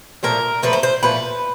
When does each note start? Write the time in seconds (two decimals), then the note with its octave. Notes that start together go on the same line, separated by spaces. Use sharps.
0.23 A#2 F3 A3 A#4
0.62 A#2 F3 A3 B4
0.73 C5
0.83 C5
1.03 A#2 F3 A3 B4